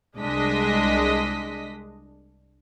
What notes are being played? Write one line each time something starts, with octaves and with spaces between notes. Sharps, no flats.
C2 G#3 D4 D#5 B6